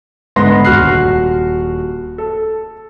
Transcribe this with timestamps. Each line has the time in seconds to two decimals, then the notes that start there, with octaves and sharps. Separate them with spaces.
0.36 G#2 D3 B3 F#5 C6 A#6
0.65 D#1 F#4 F6 F#6 C7
2.18 A4